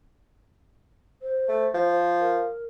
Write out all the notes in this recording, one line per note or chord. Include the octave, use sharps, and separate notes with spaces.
C5
A3
F3
A#4